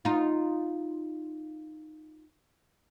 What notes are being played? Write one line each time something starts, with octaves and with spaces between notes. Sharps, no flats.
D#4 F4